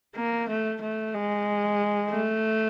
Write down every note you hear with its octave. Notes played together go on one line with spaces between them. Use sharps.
A#3
A3
A3
G#3
A3